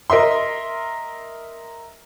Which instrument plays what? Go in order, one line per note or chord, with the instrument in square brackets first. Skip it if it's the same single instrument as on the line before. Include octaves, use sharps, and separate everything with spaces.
[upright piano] A#4 D#5 E5 C6